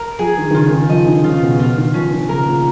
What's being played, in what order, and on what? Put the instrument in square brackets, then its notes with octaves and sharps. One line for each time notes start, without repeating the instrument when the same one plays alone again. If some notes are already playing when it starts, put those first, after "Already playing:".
Already playing: [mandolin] A#4
[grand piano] F3 [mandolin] G#4
[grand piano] D#3
D#3
[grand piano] C#3 [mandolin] F4
[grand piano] D#3
[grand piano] F3 [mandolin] D#5
[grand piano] D#3
[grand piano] C#3 [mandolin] F4
[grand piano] B2
[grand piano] B2 [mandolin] F4
[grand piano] D#3
[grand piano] F3 [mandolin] C#4
[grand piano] D#3
[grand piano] C#3 [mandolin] A#4
[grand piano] A#2